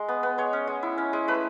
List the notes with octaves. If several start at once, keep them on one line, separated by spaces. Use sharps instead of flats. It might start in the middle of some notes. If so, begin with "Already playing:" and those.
Already playing: G#3
B3
B3
G#3 C#5
C#4
G#3
E4
C#4
G#3
A3 B4